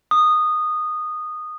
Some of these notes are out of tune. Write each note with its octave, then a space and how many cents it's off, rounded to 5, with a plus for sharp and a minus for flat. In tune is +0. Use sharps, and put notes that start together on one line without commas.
D#6 -15